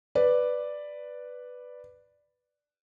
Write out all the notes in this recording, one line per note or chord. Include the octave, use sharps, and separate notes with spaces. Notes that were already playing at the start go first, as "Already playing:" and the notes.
B4 D5